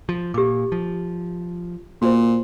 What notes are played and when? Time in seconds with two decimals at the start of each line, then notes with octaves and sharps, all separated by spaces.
0.09 F3
0.34 A#2 G4 D6
0.72 F3
2.02 A#2 F#4 C5